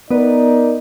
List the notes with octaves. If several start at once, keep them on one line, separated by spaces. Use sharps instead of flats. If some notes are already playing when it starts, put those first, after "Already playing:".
B3 D#4 A#4 B4 D5